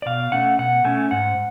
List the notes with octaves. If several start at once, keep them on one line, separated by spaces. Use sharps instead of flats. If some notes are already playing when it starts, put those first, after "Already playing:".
D5
B2 F5
A3 C#4 F#5
B2 F#5
A3 C#4 G#5
G#2 F#5